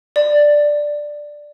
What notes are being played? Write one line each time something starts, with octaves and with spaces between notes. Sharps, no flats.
D5